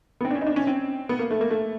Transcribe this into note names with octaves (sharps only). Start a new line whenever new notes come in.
B3
C4
D4
C#4
D#4
D4
C#4
C4
B3
A#3
A3
A#3
A3